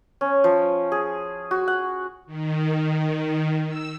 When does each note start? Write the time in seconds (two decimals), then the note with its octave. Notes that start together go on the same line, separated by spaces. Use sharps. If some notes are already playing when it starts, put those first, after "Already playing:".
0.21 C#4
0.44 F3
0.92 G#4
1.51 F#4
1.68 F#5
2.26 D#3
3.67 E6